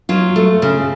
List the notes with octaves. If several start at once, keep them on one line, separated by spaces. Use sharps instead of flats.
F#3 F4
A3
C#3